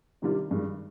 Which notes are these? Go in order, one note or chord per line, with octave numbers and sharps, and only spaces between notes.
C3 D#3 G3 D4 F4
G2 D#3 G#3